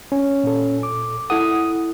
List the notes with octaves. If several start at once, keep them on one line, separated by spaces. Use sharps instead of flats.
C#4
A#2 A4
D6
E4 A4 F#5 D#6